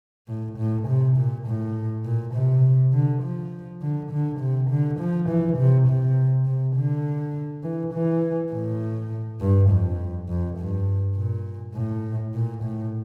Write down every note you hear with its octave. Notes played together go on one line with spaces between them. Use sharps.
A2
A2
C3
A#2
A2
A#2
C3
D3
F3
D3
D3
C3
D3
F3
E3
C3
C3
C3
D3
E3
E3
A2
G2
F2
F2
G2
A#2
A2
A#2
A2